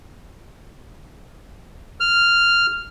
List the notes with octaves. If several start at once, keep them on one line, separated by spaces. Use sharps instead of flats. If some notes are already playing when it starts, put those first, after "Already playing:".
F6